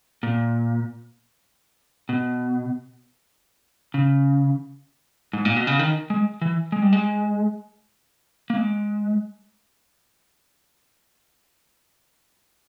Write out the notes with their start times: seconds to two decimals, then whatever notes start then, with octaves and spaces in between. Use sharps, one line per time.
0.23 A#2
2.09 B2
3.94 C#3
5.33 G#2
5.45 A#2
5.56 B2
5.67 C#3
5.79 D#3
6.10 G#3
6.42 E3
6.72 G#3
6.82 G3
6.93 G#3
8.50 A#3
8.57 G#3